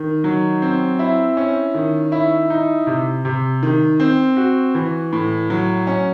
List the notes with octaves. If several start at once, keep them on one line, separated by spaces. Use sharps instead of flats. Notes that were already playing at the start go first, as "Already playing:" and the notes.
Already playing: D#3
F#3
C4
E4
C#4
D#3
E4
D#4
C3
C3
D#3
C4
F#4
E3
A2
F#3
C#4